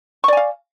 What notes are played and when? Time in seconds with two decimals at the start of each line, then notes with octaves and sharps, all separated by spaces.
0.24 C#6
0.28 D5
0.33 G#5
0.37 F5